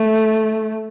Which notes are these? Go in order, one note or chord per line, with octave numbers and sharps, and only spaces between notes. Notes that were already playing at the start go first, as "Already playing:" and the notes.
Already playing: A3